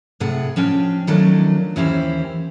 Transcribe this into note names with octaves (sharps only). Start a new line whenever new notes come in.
A2 C3 G#4 F#5
F3 C#4 D4 G5
D#3 F3 F#3 A3 C#4 D4
D#2 E3 C#4 E4 G4 C5